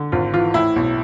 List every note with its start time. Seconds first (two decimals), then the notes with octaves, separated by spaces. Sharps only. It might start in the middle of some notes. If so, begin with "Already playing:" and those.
Already playing: D3
0.12 G#1 F4
0.33 E3 F4
0.54 A2 E4
0.76 B1